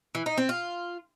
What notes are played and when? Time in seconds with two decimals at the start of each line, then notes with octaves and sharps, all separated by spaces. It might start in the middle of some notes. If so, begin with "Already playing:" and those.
0.15 E3
0.26 D#4
0.38 C4
0.49 F4